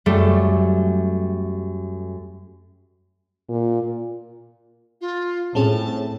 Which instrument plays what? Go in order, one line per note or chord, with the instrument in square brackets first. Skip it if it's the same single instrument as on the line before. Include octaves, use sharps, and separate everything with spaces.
[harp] F#2 G3 A3
[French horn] A#2
[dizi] F4
[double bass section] A2 [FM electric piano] C4 C#4 G#4 [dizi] A5